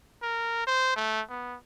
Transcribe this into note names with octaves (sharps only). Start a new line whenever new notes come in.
A#4
C5
A3
B3